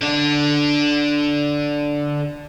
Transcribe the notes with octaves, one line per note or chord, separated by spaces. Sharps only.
D3 D4